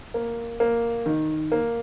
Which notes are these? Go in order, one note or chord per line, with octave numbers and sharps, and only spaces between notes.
A#3
A#3
D#3
A#3